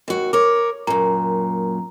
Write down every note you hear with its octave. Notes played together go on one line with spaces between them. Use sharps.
D#2 F#4
A#4 C#5 D6
F#2 A#2 A#5